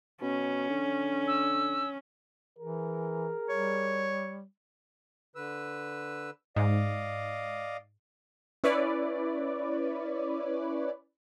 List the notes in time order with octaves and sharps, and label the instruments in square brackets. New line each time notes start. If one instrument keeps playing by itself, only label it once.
[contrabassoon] B2 [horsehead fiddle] C#4
[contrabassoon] D3
[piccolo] E6
[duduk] E3 [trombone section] G#4 A#4
[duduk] G3 [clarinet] C#5
[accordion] D3 B4 E6
[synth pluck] G#2 [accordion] D5 D#5 F5
[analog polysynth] C#4 E4 B4 C#5 D5